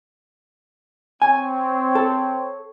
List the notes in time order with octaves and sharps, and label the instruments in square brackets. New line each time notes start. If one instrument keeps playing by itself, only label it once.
[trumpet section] C4 C#5 [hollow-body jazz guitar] G#5
[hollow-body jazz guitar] A4